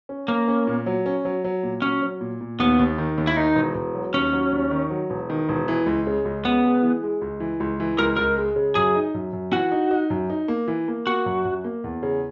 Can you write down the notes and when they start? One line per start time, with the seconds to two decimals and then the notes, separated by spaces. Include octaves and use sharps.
0.09 C#4
0.28 A#3 C#4
0.48 C#4
0.67 A#2
0.86 F#3
1.06 C#4
1.25 F#3
1.44 F#3
1.63 A#2
1.82 F#3 C#4
2.02 F#3
2.21 A#2
2.41 A#2
2.59 D#2 B3
2.79 D#2
2.98 D#3
3.18 D#2
3.27 E4
3.37 D#3 D#4
3.55 E1
3.74 E1
3.95 F#3
4.14 D#2 C#4
4.33 F#3
4.53 D#2
4.71 D#3
4.90 F#3
5.10 E1
5.30 D#3
5.49 E1
5.68 E3
5.86 C#2
6.07 C#3
6.25 C#2
6.45 C#3 B3
6.64 G#3
6.82 E3
7.03 G#3
7.21 C#2
7.40 E3
7.60 C#2
7.80 E3
7.99 C#2 A#4
8.17 C#2 A#4
8.37 G#3
8.56 C#3
8.75 F#2 G#4
8.95 D#4
9.14 F#2
9.33 F#2
9.53 E3 F#4
9.72 D#4
9.91 D#4
10.10 F#2
10.30 D#4
10.48 A#3
10.68 E3
10.88 A#3
11.07 A#3 F#4
11.26 F#2
11.45 F#2
11.64 A#3
11.84 E2
12.03 C#3